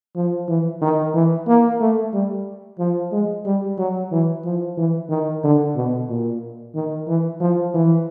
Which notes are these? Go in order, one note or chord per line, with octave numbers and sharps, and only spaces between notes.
F3
E3
D#3
E3
A#3
A3
G3
F3
G#3
G3
F#3
E3
F3
E3
D#3
D3
B2
A#2
D#3
E3
F3
E3